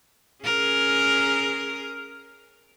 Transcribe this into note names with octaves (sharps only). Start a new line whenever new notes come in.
C#4 G#4 A#4